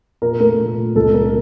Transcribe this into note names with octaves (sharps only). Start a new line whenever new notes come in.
A#2 A#4
A3 A#4
A#2
A#2
C#2 A4
C#2 A#4